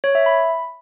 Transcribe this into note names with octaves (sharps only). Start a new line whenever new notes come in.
C#5
E5
B5